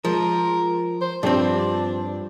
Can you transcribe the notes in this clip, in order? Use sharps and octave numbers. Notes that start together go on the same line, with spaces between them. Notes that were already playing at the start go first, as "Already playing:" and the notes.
F3 G#3 A#4
C5
G2 F3 C4 D4 G4 C5